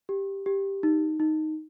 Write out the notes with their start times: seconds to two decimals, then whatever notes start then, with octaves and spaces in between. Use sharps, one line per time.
0.09 G4
0.46 G4
0.83 D#4
1.20 D#4